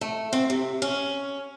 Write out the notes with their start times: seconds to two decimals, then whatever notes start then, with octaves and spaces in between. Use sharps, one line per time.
0.01 A3
0.33 C4
0.50 C3
0.82 C#4